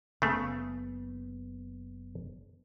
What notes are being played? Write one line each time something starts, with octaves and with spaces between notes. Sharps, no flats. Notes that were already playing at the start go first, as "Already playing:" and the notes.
F#1 C#3 A3 B3